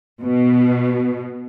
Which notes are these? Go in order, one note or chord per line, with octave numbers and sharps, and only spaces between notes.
B2